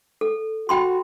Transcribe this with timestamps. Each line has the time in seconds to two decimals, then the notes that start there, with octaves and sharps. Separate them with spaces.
0.21 A4
0.69 F#4 G5 B5 C6